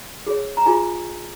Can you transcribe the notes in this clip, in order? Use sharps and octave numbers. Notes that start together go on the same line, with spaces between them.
G#4 C#5
A#5
F4 G#4 G#5